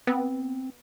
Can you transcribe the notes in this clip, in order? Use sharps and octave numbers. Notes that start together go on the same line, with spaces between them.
B3 C4